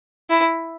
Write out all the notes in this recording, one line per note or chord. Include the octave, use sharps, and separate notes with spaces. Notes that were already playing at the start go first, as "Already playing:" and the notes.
E4